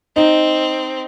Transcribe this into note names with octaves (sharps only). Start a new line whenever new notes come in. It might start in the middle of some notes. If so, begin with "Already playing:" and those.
C4 D#4